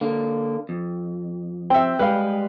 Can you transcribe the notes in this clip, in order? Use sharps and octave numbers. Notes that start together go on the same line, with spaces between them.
D3 A#3
F2
C4 E5 G5
G3 G#3 B4 F5